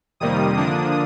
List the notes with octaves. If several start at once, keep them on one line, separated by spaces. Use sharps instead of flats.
F2 C3 D#3 G3 A#3 D#6
D3 F3 A#3 D4 D#6